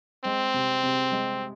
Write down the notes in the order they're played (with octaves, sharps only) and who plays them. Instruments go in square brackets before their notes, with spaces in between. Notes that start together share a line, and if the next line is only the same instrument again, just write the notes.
[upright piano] G#3 [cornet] C4
[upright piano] C3
C3
G#3